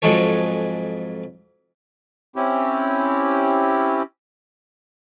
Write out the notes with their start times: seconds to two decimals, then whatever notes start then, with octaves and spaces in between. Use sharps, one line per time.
0.02 F2 G#2 F#3 G#3 A4 C#5
2.36 C4 C#4 E4 G4